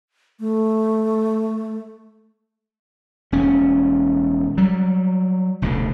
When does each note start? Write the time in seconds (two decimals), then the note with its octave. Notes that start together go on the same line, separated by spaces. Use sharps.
0.40 A3
3.32 E1 C#4
4.58 F#3 G3
5.62 F1 D2 B2 D3